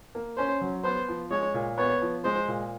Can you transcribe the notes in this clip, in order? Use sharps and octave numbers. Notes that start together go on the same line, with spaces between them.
A#3
C#4 C5
F#3
B3 C5
F3
G#3 C#5
A#2
B3 C#5
F3
G#3 C5
A#2